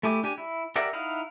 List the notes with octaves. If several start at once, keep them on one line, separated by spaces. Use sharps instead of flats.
A3 E4 G4 G#5 D6
D4 G4 G#5
E4
G4 A#4 D5 E5 F#5
D#4 E4 F5 F#5